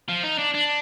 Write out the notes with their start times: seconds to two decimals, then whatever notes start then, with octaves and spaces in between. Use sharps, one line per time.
0.09 F3
0.24 D#4
0.39 D4
0.55 D4